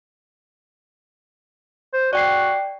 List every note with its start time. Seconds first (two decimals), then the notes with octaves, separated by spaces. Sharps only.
1.94 C5
2.13 F#4 D5 G5 C7